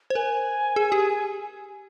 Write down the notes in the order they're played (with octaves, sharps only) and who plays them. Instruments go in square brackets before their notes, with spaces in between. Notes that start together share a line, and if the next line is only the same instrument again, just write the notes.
[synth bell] C5
[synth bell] A#4 [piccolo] G#5
[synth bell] G#4
G4